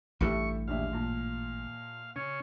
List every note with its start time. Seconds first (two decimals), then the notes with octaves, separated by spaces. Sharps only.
0.21 A1 G2 G4 A4 E5 C#6
0.68 A#1 D#2 E5 F5
0.93 A#2 A5
2.16 C#3 C#4